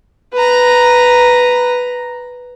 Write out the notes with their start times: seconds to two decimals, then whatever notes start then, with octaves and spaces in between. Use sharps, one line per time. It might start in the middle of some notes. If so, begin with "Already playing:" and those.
0.34 B4 A#5